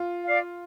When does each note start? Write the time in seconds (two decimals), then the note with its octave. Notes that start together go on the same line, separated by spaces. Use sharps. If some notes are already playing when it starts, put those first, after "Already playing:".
Already playing: F4
0.25 D5 F5